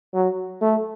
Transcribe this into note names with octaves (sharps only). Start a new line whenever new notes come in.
F#3
A3